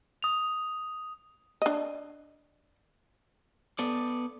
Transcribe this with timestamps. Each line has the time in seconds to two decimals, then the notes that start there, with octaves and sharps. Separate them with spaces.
0.23 D#6 F7
1.62 D4 D#5
3.79 B3 A4 D5